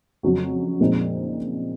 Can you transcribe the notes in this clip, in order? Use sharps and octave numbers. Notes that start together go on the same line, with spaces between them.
F2 C#3 F#3 C#4 F#4
A#2 F3 G#3 C4 D#4